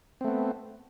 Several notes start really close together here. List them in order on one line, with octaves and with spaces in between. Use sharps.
C4 A3 B3